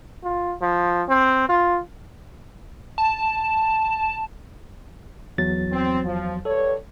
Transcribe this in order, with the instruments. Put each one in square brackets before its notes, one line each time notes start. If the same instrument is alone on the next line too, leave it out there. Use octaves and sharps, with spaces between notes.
[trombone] F4
F3
C4
F4
[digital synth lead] A5
[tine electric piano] E2 F#3 A6
[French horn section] C4
F3
[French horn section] G2 C#5 [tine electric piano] A4